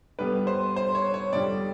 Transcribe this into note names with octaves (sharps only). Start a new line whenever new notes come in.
G2 D3 G3 B3 B4
C5
C5
C#5
C#5
F2 D3 G3 D5